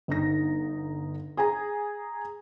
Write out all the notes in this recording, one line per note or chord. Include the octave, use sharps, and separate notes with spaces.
G1 D#4 A#6
G#4 G#5 A#5